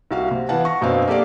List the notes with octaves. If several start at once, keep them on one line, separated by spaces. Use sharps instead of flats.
C2 F#4 F5
C3
E3 B3 F5 F#5 A5
C#6 A#6
F#2 B2 C4 D4 F5
A#3 G4 A4 D5 F5